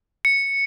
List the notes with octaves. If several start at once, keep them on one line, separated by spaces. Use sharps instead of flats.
C#7